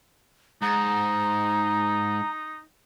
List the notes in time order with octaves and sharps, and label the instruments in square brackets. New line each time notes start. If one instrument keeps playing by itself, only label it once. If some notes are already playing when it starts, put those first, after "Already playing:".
[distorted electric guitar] G#2 [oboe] D#4 [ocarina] A#5